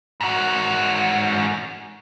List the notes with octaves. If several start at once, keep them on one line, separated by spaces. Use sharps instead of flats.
G#2 F#4